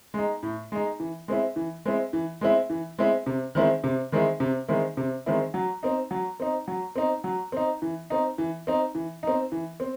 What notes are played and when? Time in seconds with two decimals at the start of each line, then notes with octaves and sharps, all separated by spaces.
0.14 G#3 D#4
0.43 A2
0.72 G#3 D#4
1.00 E3
1.28 G#3 C4 E4
1.56 E3
1.85 G#3 C4 E4
2.13 E3
2.41 G#3 C4 E4
2.70 E3
2.98 G#3 C4 E4
3.26 C3
3.55 D#3 G#3 C4 E4
3.84 C3
4.12 D#3 G#3 C4 E4
4.40 C3
4.68 D#3 G#3 C4 E4
4.97 C3
5.26 D#3 G#3 C4 E4
5.54 F#3
5.83 C4 D#4
6.11 F#3
6.40 C4 D#4
6.68 F#3
6.96 C4 D#4
7.24 F#3
7.52 C4 D#4
7.82 E3
8.10 C4 D#4
8.38 E3
8.67 C4 D#4
8.95 E3
9.23 C4 D#4
9.52 E3
9.80 C4